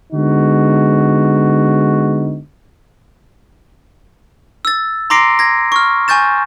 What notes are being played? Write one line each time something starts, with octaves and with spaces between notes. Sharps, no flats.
D3 G#3 B3 D#4 F#4
E6 A6
A#5 C6 D6 A#6 C7 D7
G#6 A#6
C#6 F6
G#5 C#6 G6 A6 E7